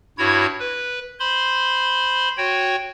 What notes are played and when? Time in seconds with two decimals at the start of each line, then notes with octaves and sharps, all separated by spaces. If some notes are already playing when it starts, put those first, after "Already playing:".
0.18 G2 E4 F#4 C#5 G#6
0.60 B4
1.20 C5 B5 C6
2.37 F#4 C#5 G5